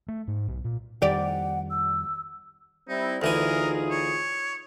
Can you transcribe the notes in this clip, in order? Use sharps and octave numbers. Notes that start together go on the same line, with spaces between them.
A3
G#2
B1
A#2
F2 D#3 G3 G4 D5 F#5
E6
G3 C4 D#4 E4
D2 E3 D#4 F4 G#4 A#4 G#5
C#5